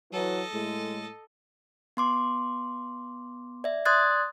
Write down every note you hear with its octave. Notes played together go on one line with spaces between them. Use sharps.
E3 F#3 A4 D#5
A2 G#3
B3 C6 D6
D5 E5
D5 C6 D#6 F#6 G#6 A6